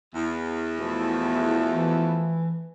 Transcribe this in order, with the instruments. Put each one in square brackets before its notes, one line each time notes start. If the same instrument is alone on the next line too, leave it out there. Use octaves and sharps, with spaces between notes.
[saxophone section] E2
[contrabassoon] B2 [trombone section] F3 A3
[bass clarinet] E3